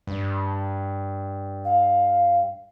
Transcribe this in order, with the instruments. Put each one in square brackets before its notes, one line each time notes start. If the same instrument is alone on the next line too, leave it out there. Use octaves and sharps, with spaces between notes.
[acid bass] G2
[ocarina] F5